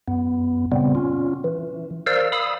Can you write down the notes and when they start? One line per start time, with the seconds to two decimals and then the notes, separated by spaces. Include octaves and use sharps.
0.08 F#2 B3
0.72 A#2 C#3 G3 B3 C4
0.95 C#4 F4
1.44 E3
2.06 A#4 C5 D5 F5 E6
2.32 F5 B5 D#6 E6